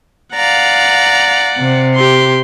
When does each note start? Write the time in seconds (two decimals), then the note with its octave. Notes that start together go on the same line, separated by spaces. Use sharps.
0.35 D5 F5 F#5 A#5
1.59 C3
1.96 G4 C6